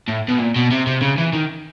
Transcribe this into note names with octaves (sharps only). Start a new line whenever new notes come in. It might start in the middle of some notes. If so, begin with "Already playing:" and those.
A2
B2
A#2
B2
C3
C3
C#3
E3
D#3